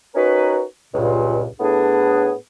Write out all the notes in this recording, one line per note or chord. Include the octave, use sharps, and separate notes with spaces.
C#4 D#4 F#4 A#4 B4
C#2 G2 A#2
A2 B3 D4 G#4